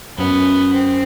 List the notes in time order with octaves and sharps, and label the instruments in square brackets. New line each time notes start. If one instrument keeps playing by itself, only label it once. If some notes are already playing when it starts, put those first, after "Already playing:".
[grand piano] F#2 [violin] B3
[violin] C4